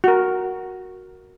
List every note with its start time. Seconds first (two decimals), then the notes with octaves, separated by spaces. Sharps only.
0.04 F#4 A#4